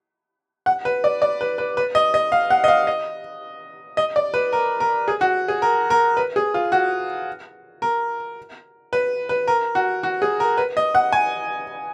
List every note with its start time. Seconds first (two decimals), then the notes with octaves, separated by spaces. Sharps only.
0.66 F#5
0.85 B4
1.04 D5
1.22 D5
1.41 B4
1.58 B4
1.77 B4
1.95 D#5
2.14 D#5
2.32 F5
2.50 F#5
2.64 D#5
2.68 F5
2.87 D#5
3.97 D#5
4.16 D5
4.34 B4
4.53 A#4
4.80 A#4
5.08 G#4
5.21 F#4
5.48 G#4
5.62 A#4
5.90 A#4
6.17 B4
6.36 G#4
6.54 F4
6.72 F#4
7.82 A#4
8.93 B4
9.29 B4
9.47 A#4
9.75 F#4
10.03 F#4
10.22 G#4
10.40 A#4
10.57 B4
10.77 D#5
10.95 F#5
11.12 G#5